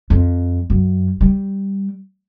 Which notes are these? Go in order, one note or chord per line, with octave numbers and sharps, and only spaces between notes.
F2
F#2
G3